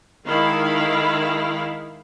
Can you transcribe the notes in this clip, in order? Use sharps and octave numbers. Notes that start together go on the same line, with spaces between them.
D#3 G#3 E4 F5 B5